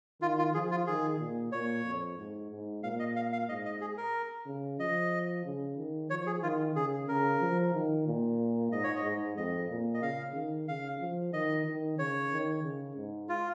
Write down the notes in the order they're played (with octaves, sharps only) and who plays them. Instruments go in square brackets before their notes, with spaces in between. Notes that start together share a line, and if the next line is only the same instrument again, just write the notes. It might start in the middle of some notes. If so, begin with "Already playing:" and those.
[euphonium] D#3 [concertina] F4
[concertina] F4
[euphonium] F3 [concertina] G#4
[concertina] F4
[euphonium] D#3 [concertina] G#4
[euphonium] A#2
[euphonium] A#2 [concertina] C#5
[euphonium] F2
G#2
G#2
[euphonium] A#2 [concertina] F5
[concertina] D#5
F5
F5
[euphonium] G#2 [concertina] D#5
[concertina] D#5
G#4
A#4
[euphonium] C#3
[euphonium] F3 [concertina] D#5
[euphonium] C#3
D#3
[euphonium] F3 [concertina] C#5
[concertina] G#4
[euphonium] D#3 [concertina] F4
[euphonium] C#3 [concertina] G#4
[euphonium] C#3 [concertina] A#4
[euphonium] F3
D#3
A#2
[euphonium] G#2 [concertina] D#5
[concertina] C#5
D#5
[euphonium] G#2
[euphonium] F2 [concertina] D#5
[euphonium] A#2
[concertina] D#5
[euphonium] C#3 [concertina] F5
[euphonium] D#3
[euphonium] C#3 [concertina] F5
[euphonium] F3
[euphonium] D#3 [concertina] D#5
[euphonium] D#3
[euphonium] C#3 [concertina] C#5
[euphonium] D#3
C#3
G#2
[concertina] F4